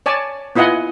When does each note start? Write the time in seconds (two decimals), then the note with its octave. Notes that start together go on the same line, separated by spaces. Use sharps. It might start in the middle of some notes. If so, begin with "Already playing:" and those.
0.06 C#5 D5 G#5 A5
0.56 B3 E4 F4 D#5 F#5 G#5